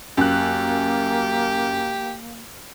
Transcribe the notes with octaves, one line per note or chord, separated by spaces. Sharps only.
F#2 A#3 G4 F#6